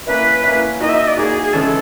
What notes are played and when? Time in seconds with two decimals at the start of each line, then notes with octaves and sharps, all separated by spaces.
0.07 A#3 C#4 E4 B4
0.43 A#3 C#4 E4
0.80 A#3 D#4 F#4 D#5
0.89 E5
0.98 D#5
1.07 D5
1.17 A#3 D#4 F#4 G#4
1.43 G#4
1.53 C#3 E3 G#3 C#4 A4